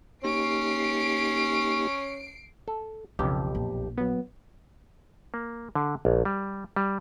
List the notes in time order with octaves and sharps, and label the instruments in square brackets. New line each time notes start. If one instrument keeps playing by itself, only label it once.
[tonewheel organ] A#3 D#4 G4 [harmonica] C#4 [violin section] C7 D7
[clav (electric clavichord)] A4
[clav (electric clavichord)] B1 F2 [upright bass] C#3 [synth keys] G4
[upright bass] A#1
[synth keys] F#3 B3
[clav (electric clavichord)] A#3
D3
A#1
G3
G3